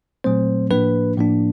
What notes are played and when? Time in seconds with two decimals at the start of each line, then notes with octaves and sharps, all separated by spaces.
0.24 A#2 F#3 A3 C4 C5
0.71 A2 F3 A#3 D4 B4
1.17 A2 F3 A#3 D4